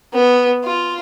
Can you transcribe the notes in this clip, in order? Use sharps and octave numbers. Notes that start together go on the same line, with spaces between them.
B3
F4